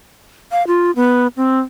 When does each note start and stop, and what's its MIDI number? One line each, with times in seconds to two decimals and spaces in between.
0.52 0.66 77
0.67 0.91 65
0.96 1.27 59
1.37 1.60 60